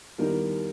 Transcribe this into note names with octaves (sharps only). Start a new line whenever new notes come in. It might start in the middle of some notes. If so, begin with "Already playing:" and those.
D#2 D#3 G3 B3 E4 A#4